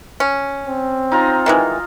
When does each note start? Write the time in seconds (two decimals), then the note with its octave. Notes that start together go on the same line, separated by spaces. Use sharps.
0.20 C#4
0.67 C4
1.12 D#4 F4 A#5
1.46 D#3 E3 G#3